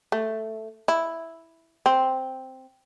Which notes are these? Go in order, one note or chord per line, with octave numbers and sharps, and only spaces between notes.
A3
E4
C4